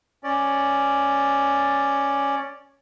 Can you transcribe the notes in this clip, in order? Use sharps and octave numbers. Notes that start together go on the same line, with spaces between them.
C#4 D5